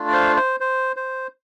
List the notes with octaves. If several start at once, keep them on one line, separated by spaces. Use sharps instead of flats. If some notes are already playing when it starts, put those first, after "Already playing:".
Already playing: A3 D4 F4
D5
C5 F5
C5
C5
C5